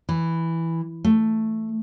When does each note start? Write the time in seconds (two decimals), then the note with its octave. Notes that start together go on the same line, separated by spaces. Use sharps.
0.09 E3
1.04 A3